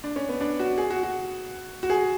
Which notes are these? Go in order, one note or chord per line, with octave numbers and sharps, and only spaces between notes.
D4
C#4
B3
D4
F#4
G#4
F#4
F#4
F#4
G#4